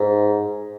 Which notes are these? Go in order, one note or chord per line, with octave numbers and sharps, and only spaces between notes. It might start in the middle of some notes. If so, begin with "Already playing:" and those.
Already playing: G#2